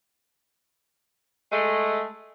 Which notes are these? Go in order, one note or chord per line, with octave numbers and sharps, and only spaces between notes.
G#3 A3